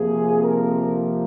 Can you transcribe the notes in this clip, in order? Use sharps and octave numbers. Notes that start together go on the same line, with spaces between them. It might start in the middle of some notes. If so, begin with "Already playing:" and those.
Already playing: F2 C3 F3 A#3 G#4
A#4